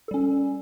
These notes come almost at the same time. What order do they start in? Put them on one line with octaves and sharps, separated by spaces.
A4 G3 C#4